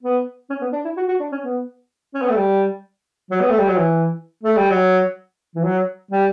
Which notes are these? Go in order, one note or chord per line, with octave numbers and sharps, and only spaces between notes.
B3
C#4
B3
D4
E4
F#4
F#4
D4
C#4
B3
C#4
B3
A3
G3
F#3
B3
A3
G3
F#3
E3
A3
G3
F#3
E3
F#3
G3